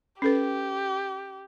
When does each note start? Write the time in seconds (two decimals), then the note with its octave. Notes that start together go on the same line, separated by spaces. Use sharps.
0.22 C#4 G4 A4 B4